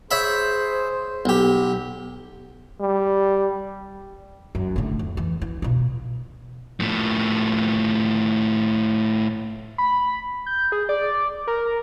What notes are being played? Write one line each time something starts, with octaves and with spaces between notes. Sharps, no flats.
G#4 C5 C#5 E5 B5
B1 G4
G3
F#2
A2 D3
F2
E3
E3
B2 F4
A2 F3
B5
G6
G#4
D5
A#4